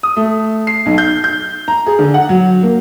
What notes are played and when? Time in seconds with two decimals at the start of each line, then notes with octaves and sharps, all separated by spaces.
0.03 D#6
0.16 A3
0.67 C7
0.86 B1
0.98 G6
1.24 G6
1.68 A#5
1.87 G#4
1.99 D3
2.14 F#5
2.29 F#3
2.63 A#3